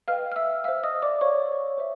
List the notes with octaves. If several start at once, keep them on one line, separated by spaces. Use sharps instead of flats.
B4 D#5 F5 G5 F6
F6
E5 E6
C5 E5 F5 E6
D#5 D#6
D5 D6
C5 C#5 F5 C#6
C5 E5